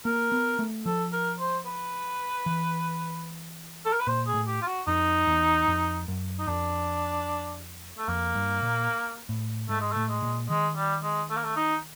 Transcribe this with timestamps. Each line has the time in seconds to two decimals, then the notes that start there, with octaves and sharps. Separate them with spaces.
0.05 A#3 A#4
0.32 B3
0.59 A3
0.86 F3 A4
1.13 A#4
1.39 C5
1.66 B4
2.46 E3
3.85 A4
3.93 A#4
4.00 B4
4.07 A#2 C5
4.27 G#4
4.34 A2
4.47 G4
4.62 F4
4.67 F#4
4.87 F2 D#4
5.27 E2
5.68 F2
6.08 F#2
6.39 D#4
6.47 F2 D4
7.98 A3
8.08 F2 A#3
8.35 G2
8.63 A#2
9.29 A2
9.69 G#2 A3
9.81 G#3
9.92 A2 A3
10.09 G#3
10.23 A#2
10.49 D#3 G#3
10.77 G3
11.03 G#3
11.30 A3
11.37 A#3
11.44 A3
11.57 D#4